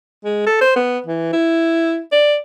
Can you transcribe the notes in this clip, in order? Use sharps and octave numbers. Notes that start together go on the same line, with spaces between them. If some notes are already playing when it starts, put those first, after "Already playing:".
G#3
A4
C5
B3
E3
E4
D5